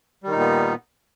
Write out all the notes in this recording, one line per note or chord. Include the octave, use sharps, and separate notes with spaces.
A#2 D#3 G3 B3 D#4